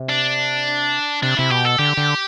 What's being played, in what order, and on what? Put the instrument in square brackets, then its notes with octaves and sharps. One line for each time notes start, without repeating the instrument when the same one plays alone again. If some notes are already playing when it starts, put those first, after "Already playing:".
Already playing: [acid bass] C3
[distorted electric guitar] D4
[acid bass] C3 [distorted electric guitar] D4
[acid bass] C3 [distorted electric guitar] E4
[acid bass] B2 [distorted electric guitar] G4
[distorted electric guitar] A4
[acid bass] D3 [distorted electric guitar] G4
[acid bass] D3